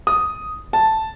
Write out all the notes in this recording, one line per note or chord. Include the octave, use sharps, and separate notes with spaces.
D#6
A5